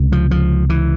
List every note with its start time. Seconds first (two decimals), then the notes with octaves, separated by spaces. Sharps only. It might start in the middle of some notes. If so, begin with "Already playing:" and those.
Already playing: C#2 C3
0.12 F3
0.31 F3
0.70 E3